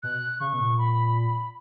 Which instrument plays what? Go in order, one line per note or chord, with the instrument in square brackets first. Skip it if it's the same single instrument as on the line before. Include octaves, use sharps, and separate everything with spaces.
[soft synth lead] B2 [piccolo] F#6
[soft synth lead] C#3 [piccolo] C#6
[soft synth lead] B2
A#2
[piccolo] B5